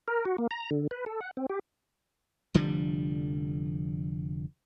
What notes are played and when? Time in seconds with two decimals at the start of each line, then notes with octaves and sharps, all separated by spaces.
0.08 A#4
0.25 F#4
0.38 A#3
0.51 A#5
0.71 D3
0.91 B4
1.06 A4
1.21 F#5
1.37 C4
1.49 G4
2.54 F1 D3 F3 G3